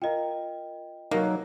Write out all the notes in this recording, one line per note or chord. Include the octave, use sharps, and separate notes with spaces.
F4 A#4 D#5 G5
F#3 A#3 D#4